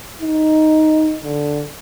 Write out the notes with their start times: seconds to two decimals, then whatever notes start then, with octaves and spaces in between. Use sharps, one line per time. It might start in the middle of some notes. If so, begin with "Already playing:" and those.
0.22 D#4
1.24 D3